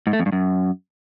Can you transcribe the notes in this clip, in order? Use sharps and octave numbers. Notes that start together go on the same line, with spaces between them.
G#2
A3
F2
G2
F#2